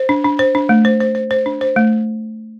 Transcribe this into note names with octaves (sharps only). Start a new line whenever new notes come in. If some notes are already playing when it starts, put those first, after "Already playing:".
Already playing: C5
D4
D4
C5
D4
A3
C5
C5
C5
C5
D4
C5
A3